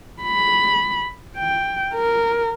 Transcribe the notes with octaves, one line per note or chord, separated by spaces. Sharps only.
B5
G5
A#4